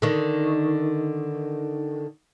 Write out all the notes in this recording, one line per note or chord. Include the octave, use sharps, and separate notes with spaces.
D3 D#3